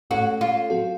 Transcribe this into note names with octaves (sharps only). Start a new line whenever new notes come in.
A2 A3 C#4 F#4 A4
F4
F#3 C4 F#4 A4